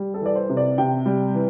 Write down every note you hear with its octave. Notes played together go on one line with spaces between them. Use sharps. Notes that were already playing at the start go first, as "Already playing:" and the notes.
Already playing: G3
A4
E3 D5
C5
C3
D5
C3 G5
G3
E3